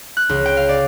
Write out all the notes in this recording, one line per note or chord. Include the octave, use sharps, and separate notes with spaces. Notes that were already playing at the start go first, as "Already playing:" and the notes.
F#6
C#2
G5
F5
D5